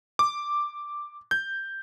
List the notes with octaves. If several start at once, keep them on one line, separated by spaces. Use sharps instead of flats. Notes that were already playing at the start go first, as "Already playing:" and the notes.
D6
G6